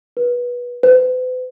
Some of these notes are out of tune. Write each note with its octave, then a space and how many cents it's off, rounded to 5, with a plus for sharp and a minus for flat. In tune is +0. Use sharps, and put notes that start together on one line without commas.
B4 -20
B4 +45